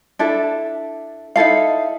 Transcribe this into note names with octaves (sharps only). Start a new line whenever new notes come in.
D4 E4 A4
D#4 E4 A4 F5